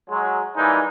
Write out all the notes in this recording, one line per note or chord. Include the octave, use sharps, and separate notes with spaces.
F#3 G#3
E3 G3 G#3 A#3 D#4